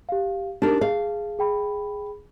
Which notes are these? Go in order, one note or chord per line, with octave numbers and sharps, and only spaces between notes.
G4 F5
D4 D#4 G4 A#4
G#4 F5
G#4 G5 B5